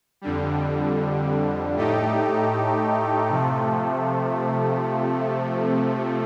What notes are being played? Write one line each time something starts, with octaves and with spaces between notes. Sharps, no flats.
F2 D3 G3
A2 A3 D#4 G4
C3 F3 A3